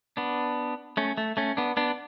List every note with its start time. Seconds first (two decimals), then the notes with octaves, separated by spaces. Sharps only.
0.17 B3 D4
0.97 A3 C#4
1.18 A3
1.37 A3 C#4
1.57 B3 D4
1.77 B3 D4